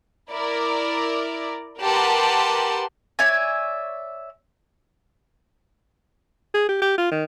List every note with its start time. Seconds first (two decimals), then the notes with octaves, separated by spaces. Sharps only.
0.31 E4 A#4 D5
1.82 G4 A#4 B4 F#5 A5 C6
3.19 C#5 D5 E5 G#5
6.54 G#4
6.68 G4
6.82 G4
6.98 F4
7.11 D#3